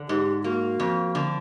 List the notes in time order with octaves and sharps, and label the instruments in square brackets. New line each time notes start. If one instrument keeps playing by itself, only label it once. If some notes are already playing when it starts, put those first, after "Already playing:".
Already playing: [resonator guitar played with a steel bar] D3
[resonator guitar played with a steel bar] G#2 [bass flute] G4
[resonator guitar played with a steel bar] A#3 [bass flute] F#4
[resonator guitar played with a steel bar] F2
D3